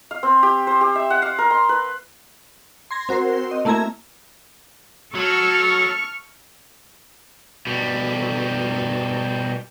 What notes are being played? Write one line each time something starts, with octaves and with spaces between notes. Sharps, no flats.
F5
C4
G4
C5
G4
E5
F#5
F5
A#4
C6
B4
C6 G#6 A#6
C4 F#4 A#4 C5 C6
D#5
A3 A#3 E4 E5 A#5 G#6
F#3 A4 C#6 F6
B2 G3